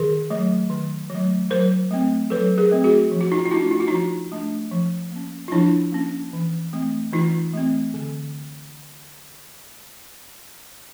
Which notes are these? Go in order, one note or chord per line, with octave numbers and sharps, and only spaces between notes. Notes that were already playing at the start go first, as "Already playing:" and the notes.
Already playing: D#3 G#4 A#4
F#3 A3
D#3
F#3 A3
F#3 A#4 C5
A3 C4
F#3 A4 B4
G#4 A#4
A3 C4
F#4 G#4
F3
F#4
D#4 F4
F4
A3 D4 E4 F#4
F4
F#4
F3 D#4 F4
A3 D4
F3
A#3 C#4
F4
F3 D4 E4
A#3 C#4
E3
A3 C4
E3 D#4 F4
A3 C4
D3